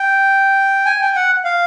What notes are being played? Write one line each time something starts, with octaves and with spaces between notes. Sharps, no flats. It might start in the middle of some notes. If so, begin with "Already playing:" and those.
Already playing: G5
G#5
G5
F#5
F5